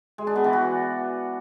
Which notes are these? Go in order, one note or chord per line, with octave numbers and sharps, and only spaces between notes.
G#3
D4
B3
E3
F#4